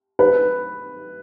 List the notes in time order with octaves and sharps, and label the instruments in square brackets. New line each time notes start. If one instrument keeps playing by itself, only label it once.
[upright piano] B4